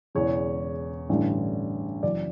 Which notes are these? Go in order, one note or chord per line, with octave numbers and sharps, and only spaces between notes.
E1 E2 C#3 C#5
A1 G2 D3
F#1 F#2 E3 D5